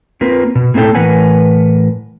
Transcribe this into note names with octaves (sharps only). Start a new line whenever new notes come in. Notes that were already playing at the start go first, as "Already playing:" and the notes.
A#3 C4 F4 A#4 B4
B2
A2 A#3 C4 E4 A4 G5
A2 E3 A#4 B4 F#5 G#5